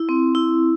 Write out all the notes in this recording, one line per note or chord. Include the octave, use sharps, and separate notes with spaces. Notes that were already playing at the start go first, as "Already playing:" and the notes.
Already playing: E4
C4
E4